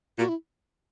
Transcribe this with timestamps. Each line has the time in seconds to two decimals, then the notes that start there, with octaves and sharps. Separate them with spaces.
0.19 A#2 F#4
0.29 E4